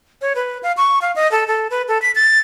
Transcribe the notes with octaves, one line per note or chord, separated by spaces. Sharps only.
C#5
B4
F5
C#6
F5
D#5
A4
A4
B4
A4
B6
A6